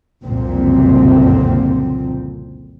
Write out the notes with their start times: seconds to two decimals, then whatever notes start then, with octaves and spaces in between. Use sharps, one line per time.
0.24 F#1 C2 F2 A#2 D3 C4